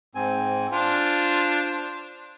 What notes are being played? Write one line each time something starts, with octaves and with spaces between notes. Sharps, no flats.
G#2 C4 G#5
D4 F4 C5